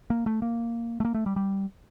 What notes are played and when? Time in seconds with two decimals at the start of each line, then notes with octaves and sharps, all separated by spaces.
0.10 A#3
0.26 A3
0.42 A#3
1.00 A3
1.05 A#3
1.14 A3
1.26 G3
1.36 G3